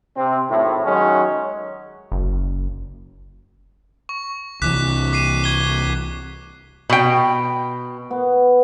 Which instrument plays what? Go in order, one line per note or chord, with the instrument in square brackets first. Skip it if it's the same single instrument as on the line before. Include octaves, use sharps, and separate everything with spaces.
[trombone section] C3 C4
G#1 A2
D#3 F#3 G#3 C#4
[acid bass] F#1
[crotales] C#6
[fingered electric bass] C2 E3 [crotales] D6 F#6 B6
[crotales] D6 C7 D#7
C#6 G#6 G7
[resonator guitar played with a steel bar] B2 G5
[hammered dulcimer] B3